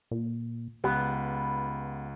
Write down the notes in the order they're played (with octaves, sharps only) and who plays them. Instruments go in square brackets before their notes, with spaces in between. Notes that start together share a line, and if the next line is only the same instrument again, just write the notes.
[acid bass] A#2
[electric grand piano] C#2 [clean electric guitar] B3 [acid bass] G4